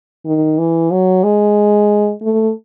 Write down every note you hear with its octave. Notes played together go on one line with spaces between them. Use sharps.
D#3
E3
F#3
G#3
A3